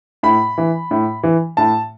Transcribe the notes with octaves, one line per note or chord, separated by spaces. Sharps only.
A2 B5
E3
A2
E3
A2 A5